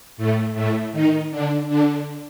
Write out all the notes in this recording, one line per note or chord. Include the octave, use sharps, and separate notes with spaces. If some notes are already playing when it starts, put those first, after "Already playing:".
A2 A3
A2 A3
D#3 D#4
D3 D4
D3 D4